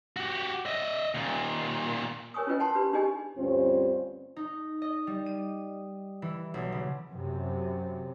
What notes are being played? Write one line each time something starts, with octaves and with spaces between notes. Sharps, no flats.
F#4 G4
D#5 E5
D#2 A#2
A#4 C#5 G#5 C#6 D#6
C#4 E4 F4 B4 D#5 G5
F#5 G5 A5 C6
D4 G4 B4 B5
D4 D#4 G4 G#4 D#5 G#5
D2 G2 C4 C#4 F4 C5
D#4
D#5
G3
D#7
E3
B1
C#3
F#2 C3